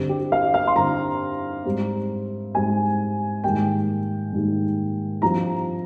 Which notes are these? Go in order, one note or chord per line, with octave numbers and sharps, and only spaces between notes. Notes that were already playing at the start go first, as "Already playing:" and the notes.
Already playing: G2 D3 G3 C4
G4
F5
F5
C6
G2 D3 G3 C4 A#5
G#2 G3 C4
G#2 G3 C4 G#5
G#2 D#3 G3 A#3 G5
G#2 D#3 G3 A#3
G2 F3 C4 A#5